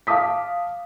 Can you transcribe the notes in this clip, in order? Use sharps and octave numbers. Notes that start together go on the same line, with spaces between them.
F5 A5 D6 D#6 B6